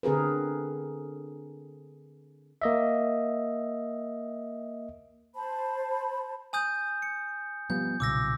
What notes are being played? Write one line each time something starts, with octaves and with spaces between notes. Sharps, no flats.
D3 C4 G#4 A#4 B4
A#3 D#5 E5
C5 A5 B5
G#5 D#6 G6
C#7
F3 G3 B3 G6
B1 A#2 C#3 D6 E6 A#6